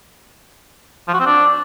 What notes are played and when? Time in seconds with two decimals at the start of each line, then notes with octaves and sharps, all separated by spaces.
1.08 F3
1.14 F#4
1.20 C4
1.26 D4